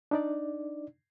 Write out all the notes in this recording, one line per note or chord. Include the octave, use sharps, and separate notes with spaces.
D4 D#4 D5